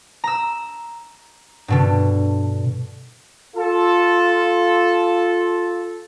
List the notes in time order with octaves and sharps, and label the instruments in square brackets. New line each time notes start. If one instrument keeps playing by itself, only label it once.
[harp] A#5 E6
G2 B2 D3
[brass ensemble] F4 A4